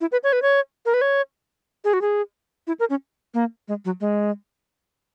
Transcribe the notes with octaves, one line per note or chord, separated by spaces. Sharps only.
E4
B4
C#5
B4
C#5
A#4
B4
C#5
G#4
F#4
G#4
E4
A#4
C#4
A#3
G#3
F#3
G#3